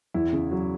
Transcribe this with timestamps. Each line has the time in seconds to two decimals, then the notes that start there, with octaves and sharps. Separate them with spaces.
0.14 E2 E4
0.33 C#3
0.51 F#3